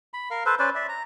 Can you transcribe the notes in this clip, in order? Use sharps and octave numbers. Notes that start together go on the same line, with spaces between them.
B5
A#4 F5
A4 B4 C5
C#4 B4 C5 D5
D5 E5
A#5